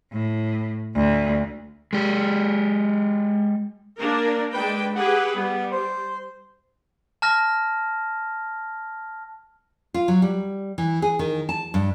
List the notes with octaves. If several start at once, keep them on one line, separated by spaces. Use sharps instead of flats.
A2
D2
G#3 G4
A#3 D4 A#4
G#3 D4 B4 G5
G4 G#4 B4 F#5
G3 B3
C5
A5 F6 A#6
F4
F#3
G3
E3
G#4
D#3
A5
G2